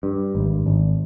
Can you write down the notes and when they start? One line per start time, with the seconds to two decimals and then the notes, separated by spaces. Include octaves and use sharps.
0.03 G2
0.35 G#1
0.66 G#1